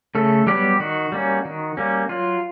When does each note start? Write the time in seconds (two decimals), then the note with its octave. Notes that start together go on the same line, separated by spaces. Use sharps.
0.15 C#3 A3 A4
0.47 F#3 G3 B3 G4
0.80 D#3 F#4
1.12 G3 A#3 C#4
1.45 D#3
1.77 G3 A#3 C#4
2.09 F#3 F4